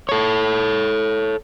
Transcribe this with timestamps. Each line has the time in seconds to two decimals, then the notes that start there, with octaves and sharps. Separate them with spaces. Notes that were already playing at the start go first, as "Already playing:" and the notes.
0.09 A4 C#5